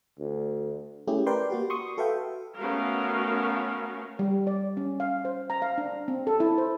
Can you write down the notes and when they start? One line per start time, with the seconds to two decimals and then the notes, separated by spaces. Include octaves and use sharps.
0.19 D2
1.07 A3 C#4 E4 G4 G#4
1.26 A#4 B4 D5 G5 C6
1.50 A#3 F#4 G4
1.70 C6 C#6 D#6
1.97 F#4 A4 B4 E5 F5 G5
2.58 A3 B3 C#4 F#4 A#4 F5
4.19 G3
4.47 D5
4.77 C#4
5.00 F5
5.25 C5
5.50 A#5
5.62 F5
5.78 D4
6.08 C4
6.27 A4
6.40 E4
6.58 C5